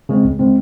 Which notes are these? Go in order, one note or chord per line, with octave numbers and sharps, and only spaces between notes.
C#3 G#3 C4
C#2
C#3 G#3 C4